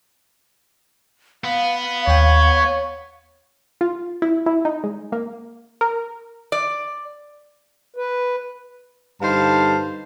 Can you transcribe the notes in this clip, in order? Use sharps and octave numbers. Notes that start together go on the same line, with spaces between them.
B3 F5
D#2 C#5 G5
F4
E4
E4
D#4
G#3
A#3
A#4
D5
B4
G2 D3 D#4 C5 F5 A5